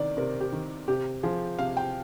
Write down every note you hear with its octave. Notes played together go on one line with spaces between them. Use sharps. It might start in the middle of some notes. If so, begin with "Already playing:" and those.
Already playing: C3 D#3 D5
C3 A#4
G4
D#3
C3 G4
F3 G#4
C3 F5
G5